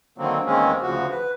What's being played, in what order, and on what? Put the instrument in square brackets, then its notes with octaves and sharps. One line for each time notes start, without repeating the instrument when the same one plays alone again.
[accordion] D3 D#3 F#3 A#3 C4
E2 D#3 G#3 A#3 C4 C#4
D2 C#3 F3 F#4
B4